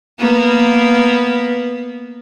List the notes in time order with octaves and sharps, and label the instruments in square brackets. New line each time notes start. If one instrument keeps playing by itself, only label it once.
[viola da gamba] A#3 B3